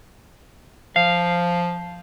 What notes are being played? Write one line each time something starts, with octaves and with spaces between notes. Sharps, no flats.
F3 F5